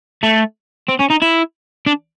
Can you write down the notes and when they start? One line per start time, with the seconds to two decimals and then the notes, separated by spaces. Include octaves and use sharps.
0.23 A3
0.88 C4
0.99 C#4
1.10 D#4
1.22 E4
1.87 D4